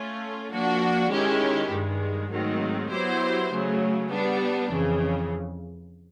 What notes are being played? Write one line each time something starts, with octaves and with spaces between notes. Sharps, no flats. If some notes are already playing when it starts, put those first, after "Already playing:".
Already playing: A3 C#4 F4
F3 A#3 D4 F#4
D#3 G#3 C#4 E4 G4
G2 D#3 G#3
G#2 D#3 F#3 A3 C4
F#3 B3 E4 G4 C5
C#3 F#3 A3
G3 B3 D4
F2 C#3 E3